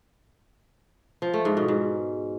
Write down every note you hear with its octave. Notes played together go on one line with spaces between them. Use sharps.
F3
A3
G#2
B2
G#2